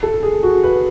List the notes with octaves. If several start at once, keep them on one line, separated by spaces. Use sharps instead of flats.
A4
G#4
F#4
B4